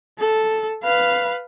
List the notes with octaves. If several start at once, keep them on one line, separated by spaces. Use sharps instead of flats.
A4
B4 F5